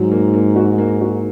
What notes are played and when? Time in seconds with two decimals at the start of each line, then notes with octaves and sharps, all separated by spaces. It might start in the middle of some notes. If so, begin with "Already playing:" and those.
Already playing: G#2 F#3
0.12 A#3
0.33 A#3
0.56 F#4
0.78 A#3
1.01 F#4